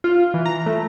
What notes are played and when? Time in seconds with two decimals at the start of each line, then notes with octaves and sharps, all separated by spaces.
0.04 F4
0.34 E3
0.46 A#5
0.66 A3